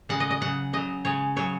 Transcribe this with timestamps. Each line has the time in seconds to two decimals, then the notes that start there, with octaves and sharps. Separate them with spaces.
0.09 C#3 G#3 F#5
0.20 D#5
0.31 D#5
0.41 C#3 F#3 F#5
0.73 C#3 F#3 D#5
1.05 C#3 G#3 C#5
1.36 C#3 F#3 C#5